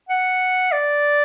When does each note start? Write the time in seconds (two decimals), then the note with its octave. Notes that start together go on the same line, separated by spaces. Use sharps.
0.09 F#5
0.72 D5